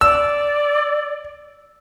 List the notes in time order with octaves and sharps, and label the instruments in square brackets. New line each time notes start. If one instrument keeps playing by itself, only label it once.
[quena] D5 [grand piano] E6